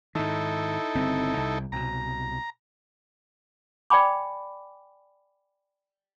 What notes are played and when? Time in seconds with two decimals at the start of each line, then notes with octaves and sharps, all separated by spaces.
0.15 G#2 D#3 D#4 E4 A4
0.95 G1 C#3 C4
1.37 C2
1.72 C2 B2 A#5
3.90 D5 G5 G#5 B5 D6